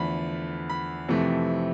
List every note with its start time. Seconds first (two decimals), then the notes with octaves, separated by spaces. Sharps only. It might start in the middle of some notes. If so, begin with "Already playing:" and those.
Already playing: E2 D3 F3 A3 B5
0.69 B5
1.09 F2 C3 E3 A3